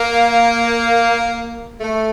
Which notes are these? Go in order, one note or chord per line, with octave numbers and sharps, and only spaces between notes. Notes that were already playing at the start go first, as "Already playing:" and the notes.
Already playing: A#3
A3